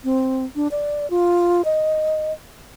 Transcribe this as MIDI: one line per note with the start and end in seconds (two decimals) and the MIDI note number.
0.04 0.45 60
0.56 0.68 62
0.71 1.09 74
1.10 1.64 65
1.65 2.32 75